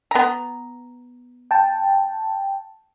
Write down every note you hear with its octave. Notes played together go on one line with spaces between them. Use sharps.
B3 A#5
G5 A5